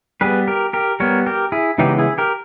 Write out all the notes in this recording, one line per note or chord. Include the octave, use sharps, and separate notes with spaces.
G3 B3 G#4 B4
G4 A#4
G4 A#4
G3 B3 A#4 C#5
G4 A#4
E4 G#4
C#3 E3 G#3 B3 D#4 G4
E4 G#4
G4 A#4